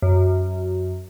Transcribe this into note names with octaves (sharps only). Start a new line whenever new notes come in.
F#2